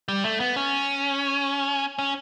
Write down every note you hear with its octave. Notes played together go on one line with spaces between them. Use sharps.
G3
A3
B3
C#4
C#4